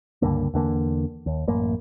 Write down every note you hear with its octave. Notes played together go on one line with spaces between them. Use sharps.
C#2 G2 D3 A#3
E2 D3 A#3
D#2
A1 F#2 A#3